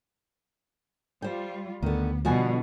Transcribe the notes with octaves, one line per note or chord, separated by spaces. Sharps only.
G3 F4 C5 G5
D2 D3 D#3 B3
B2 D3 F3 G3 F#4 G#5